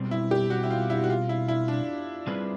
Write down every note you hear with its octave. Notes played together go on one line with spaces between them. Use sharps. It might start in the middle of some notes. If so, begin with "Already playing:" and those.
Already playing: B2 G3 C4
E4
G4
F#4
E4
F4
E4
F#4
F4
E4
E4
D4
G3 C4 F4 G#4 B4